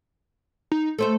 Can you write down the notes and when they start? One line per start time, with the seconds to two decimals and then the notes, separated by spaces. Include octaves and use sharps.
0.72 D#4
0.99 A3 A4 C5 E5